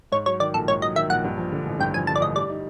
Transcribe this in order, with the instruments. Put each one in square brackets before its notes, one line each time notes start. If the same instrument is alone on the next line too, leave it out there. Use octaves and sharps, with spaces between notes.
[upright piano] G#2 [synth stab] C#5
[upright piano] F#3 [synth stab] C#5
[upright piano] D#3 [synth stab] D5
[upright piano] A#1 [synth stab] A4
[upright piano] G#2 [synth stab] C#5
[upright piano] F#3 [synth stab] D#5
[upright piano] D#3 [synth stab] E5
[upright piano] A#1 [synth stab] F#5
[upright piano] G2
F3
D3
A1
[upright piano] G2 [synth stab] G5
[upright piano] F3 [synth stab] G#5
[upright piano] D3 [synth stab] A5
[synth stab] D5
[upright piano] A1 [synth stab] D#5
[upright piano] G3 [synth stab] D5
[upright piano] D#4